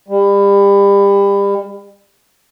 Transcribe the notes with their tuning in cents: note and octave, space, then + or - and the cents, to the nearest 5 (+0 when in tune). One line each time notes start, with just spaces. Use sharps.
G3 +30